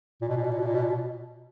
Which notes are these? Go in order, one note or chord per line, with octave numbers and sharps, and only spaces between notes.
A#2
B2
A#2
B2
A#2
B2
A#2
B2
A#2
B2